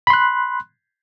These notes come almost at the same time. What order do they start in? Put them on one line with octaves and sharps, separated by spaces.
B5 C6 F#6